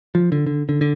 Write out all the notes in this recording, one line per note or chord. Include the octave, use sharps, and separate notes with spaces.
F3
D3
D3
D3
D3